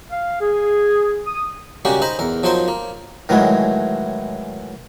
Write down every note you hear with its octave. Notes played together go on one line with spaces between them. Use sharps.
F5
G#4
D#6
C#3 G3 G#3 A#3 F#4 G4
D#4 C5 D#5 A#5 B5
E2 A#4
F3 F#3 D#4 A#4 C5 C6
A#3
A2 D#3 E3 F#3 G#3